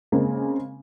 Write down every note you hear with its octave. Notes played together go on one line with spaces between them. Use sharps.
C#3 G#3 A#3 C4